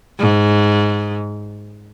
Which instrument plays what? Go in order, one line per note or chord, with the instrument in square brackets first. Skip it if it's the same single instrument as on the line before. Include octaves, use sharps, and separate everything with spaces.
[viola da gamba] G#2